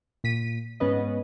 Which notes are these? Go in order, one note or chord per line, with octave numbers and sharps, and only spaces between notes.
A#2 B6 D#7
G#2 B3 C#4 B4 D#5